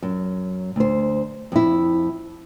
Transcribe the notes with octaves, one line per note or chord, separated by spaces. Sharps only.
F#2
D2 C5
F2 E4